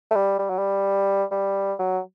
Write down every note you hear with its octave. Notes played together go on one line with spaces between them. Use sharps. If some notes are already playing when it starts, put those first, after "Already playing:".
A3
G3
G3
F#3
G3
G3
F#3